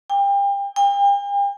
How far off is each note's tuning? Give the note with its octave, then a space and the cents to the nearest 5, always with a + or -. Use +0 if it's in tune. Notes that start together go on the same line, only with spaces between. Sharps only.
G5 +35
G5 +40